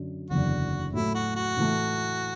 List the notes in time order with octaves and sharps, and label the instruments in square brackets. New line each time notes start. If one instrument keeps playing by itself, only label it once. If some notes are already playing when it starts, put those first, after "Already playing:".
Already playing: [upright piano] F#2 D3 F#3
[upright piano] F#1 E2 D3 [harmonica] F#4
[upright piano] A2 F#3 A3 [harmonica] E4
[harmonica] F#4
F#4
[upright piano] A2 E3 A3